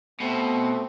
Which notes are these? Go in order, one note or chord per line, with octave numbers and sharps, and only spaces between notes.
B2 A3 C4